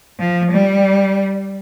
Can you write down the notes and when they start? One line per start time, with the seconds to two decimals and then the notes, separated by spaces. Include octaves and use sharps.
0.19 F3
0.51 G3